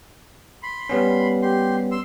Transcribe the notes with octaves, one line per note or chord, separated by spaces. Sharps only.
B5 C6
G3 B3 C#4
G4 C6
C6 E6